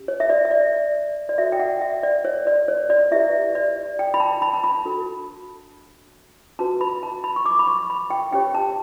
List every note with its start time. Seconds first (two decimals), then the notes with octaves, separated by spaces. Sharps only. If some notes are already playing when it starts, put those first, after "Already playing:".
Already playing: C#4 G4
0.08 C#5
0.20 E5
0.30 D5
0.45 E5
0.51 D5
1.29 D5
1.38 F#4 A4 C#5 E5
1.52 G5
1.60 F#5
1.81 E5
2.03 D5
2.25 C#5
2.47 D5
2.68 C#5
2.90 D5
3.11 E4 G4 B4 E5
3.55 D5
3.99 G5
4.14 B5
4.20 A5
4.42 B5
4.54 A5
4.64 B5
4.85 D4 F#4 A4
6.59 C#4 F#4 B4 A5
6.81 B5
7.03 A5
7.24 B5
7.36 C#6
7.46 D6
7.59 B5
7.67 C#6
7.90 B5
8.10 G5
8.32 C#4 G4 C#5 G5
8.55 A5